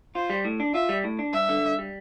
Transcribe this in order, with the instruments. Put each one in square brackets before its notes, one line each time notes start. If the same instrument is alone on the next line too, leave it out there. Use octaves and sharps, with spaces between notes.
[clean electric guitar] F4 [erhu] C5
[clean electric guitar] G3
A2
D4
[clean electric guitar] F4 [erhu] E5
[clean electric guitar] G3
A2
D4
[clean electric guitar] G2 [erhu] E5
[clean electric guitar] D3
G2
G3